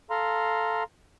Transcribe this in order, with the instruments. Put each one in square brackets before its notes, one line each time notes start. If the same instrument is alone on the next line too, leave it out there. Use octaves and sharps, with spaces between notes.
[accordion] A4 F5 A#5 C6